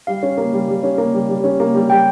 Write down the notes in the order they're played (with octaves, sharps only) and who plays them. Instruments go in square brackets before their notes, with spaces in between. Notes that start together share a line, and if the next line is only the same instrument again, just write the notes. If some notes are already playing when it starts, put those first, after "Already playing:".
[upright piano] G3 [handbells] F5
[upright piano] C#4
A#3
G3
G3
C#4
A#3
G3
G3
C#4
A#3
G3
[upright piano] G3 [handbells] G5